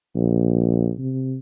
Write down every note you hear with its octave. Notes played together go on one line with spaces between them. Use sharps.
A#1
C3